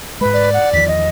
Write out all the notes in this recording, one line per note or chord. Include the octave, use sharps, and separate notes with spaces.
G#2 G#3 B4 B5
D5
F#5
E2 D#3 F3 B6
D#5